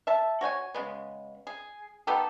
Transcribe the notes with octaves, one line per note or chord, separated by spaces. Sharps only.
E5 A5
F#4 C#5 G5 G#5
C#3 G#3 B3
G#4
B3 D#4 G4 A4